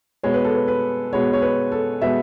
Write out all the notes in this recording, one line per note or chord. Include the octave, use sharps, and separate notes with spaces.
B2 G#3 B3 C#5
B4
A4
B4
B4
B2 G#3 B3 C#5
C#5
B4
A4
B2 G#3 B3 E5